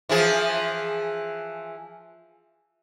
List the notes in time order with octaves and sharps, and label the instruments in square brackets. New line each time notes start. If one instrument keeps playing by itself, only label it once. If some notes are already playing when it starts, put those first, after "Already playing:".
[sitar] E3 F3 G#4